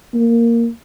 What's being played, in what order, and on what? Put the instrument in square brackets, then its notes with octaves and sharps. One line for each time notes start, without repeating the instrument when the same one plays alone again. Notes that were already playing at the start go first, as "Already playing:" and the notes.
[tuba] A#3